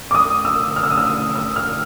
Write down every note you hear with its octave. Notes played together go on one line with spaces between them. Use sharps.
D6
D#6
E6
F6
E6
D#6
E6
E6
F6